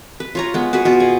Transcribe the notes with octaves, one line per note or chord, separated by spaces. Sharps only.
B4
F4 C#5 A#5
G#3 B3
F#4 G#4 B4 B5
B2 F4
G#4